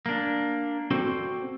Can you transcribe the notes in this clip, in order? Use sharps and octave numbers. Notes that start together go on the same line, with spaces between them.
A#3 D4
C4 F#4 A4 C5 D5